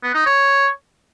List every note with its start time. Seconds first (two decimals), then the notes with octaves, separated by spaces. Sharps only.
0.03 B3
0.14 D#4
0.26 C#5